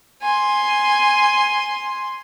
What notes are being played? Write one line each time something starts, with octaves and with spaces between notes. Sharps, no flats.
G#5 C6